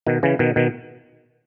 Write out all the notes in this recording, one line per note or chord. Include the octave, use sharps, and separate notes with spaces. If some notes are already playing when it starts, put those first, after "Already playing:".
B2 D#3
C#3 E3
B2 D#3
B2 D#3